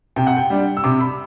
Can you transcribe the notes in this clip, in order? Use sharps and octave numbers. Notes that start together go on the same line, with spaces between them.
C3 G5
F#5
G5
G3 D4
E6
C3 D6
B5